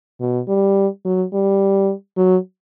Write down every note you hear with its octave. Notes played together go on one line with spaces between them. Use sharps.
B2
G3
F#3
G3
F#3